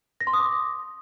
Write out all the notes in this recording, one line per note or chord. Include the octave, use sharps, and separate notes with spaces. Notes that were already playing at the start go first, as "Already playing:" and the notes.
A#6
C6
D#6
D6